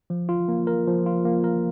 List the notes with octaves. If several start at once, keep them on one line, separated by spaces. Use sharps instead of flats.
F3
F4
A#3
A#4
F3
F4
A#3
A#4